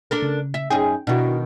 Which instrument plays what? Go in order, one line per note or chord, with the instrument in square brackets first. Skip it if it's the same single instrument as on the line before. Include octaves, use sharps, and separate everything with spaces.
[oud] D4 A4 A#4
[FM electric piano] C#3
[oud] E5
[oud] F#2 G#4 [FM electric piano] C#4 D#4 G5
[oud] B2 D#3 [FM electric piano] D4 E4 F#4